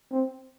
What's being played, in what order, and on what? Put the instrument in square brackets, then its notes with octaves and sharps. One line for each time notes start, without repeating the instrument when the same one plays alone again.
[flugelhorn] C4